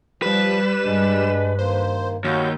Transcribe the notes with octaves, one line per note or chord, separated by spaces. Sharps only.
F3 G3 B4 E7
G2 G#3 D4
D#3 A#3 C5
D#2 F#4 C#5 G6